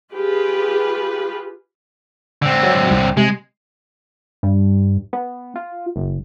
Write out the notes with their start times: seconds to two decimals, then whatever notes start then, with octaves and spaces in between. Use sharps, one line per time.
0.14 F4 G4 G#4 B4
2.42 D3 C4
2.63 F#3
2.91 C2
3.17 C3 G#3
4.43 G2
5.13 B3
5.56 F4
5.96 F#1